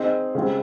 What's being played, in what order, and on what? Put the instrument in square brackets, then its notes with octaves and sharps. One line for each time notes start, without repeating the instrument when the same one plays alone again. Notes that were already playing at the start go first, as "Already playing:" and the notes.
Already playing: [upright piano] C4 D#4 G#4 D#5
C#3 G#3 C4 G4